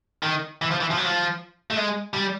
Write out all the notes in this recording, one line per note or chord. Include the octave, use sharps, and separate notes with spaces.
D#3
E3
F3
E3
F3
F#3
F3
A3
G#3
G3